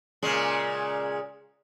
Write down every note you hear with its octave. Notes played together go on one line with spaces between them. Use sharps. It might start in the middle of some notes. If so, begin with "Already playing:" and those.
A#2 C#3 G#3